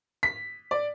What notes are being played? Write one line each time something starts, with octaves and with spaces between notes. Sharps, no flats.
B6
D5